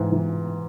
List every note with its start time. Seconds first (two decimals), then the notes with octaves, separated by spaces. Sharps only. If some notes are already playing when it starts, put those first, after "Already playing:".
Already playing: G#2 E3
0.12 E3